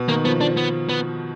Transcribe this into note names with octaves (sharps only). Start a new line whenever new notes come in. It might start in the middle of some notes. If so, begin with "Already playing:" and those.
Already playing: B2
D#3 A#3
F3 B3
F3 D4
B3
B3